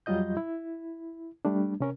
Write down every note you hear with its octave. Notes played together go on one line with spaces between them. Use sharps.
F2 F#3 G3 F4 D#5 G6
E4
G3 A3 D4
C3 C#4 A#4